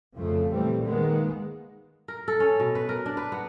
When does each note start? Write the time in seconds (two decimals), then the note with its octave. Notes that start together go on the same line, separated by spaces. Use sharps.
0.17 F2 C#3 F3 A3
0.51 A#2 E3 G3 A3 C4
0.84 D#3 G#3 A#3 B3
2.08 A#4
2.28 A4
2.40 C#4
2.60 B2
2.75 B4
2.89 A#4
3.06 D4
3.17 B4
3.32 B3